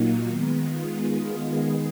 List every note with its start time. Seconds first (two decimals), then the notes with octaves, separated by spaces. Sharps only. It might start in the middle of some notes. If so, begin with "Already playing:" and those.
Already playing: A#2 F#3 A#3 D#4 F4 F#4
0.26 D#3 G#3 B3
0.59 F4
0.92 G#4
1.57 D#3 G#3 B3 G#4